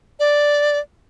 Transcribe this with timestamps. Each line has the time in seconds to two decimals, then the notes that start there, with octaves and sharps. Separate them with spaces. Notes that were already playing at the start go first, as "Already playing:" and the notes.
0.20 D5